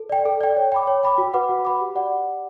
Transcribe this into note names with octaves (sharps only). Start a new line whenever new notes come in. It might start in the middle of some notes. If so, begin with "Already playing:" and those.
Already playing: A4
D5 G5
A4
D5 G5
C#5
G5 B5 D6
C#5
G5 B5 D6
F#4
B4 F#5 B5 D6
F#4
B4 F#5 B5 D6
G4
D5 F#5